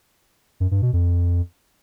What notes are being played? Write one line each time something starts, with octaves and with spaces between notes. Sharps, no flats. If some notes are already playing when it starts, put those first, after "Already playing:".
F#2
G2
B2
F2